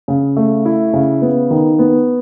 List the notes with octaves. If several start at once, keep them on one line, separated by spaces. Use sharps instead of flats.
C#3
A3
E4
C#3
B3
D#3
B3